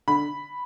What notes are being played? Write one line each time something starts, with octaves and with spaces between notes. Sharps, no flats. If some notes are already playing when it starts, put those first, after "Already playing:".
D3 B5